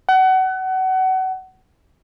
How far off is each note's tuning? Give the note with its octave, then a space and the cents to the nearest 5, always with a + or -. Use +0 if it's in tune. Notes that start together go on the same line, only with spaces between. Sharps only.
F#5 +30